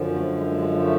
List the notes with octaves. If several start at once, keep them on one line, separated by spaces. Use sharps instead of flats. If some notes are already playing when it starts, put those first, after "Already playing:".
Already playing: F#2 D3 F3
A3
G#3
G#3
A3